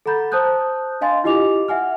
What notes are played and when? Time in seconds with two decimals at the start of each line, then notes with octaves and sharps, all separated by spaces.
0.06 A4 F#5 A#5 B5 G6 A6
0.32 C5 A5 D#6 F#6 G6
1.01 D4 D#5 F5 G#5 C6 A6
1.24 E4 F4 G4 D#5 D6 F7
1.68 E5 F#5 G#5 F6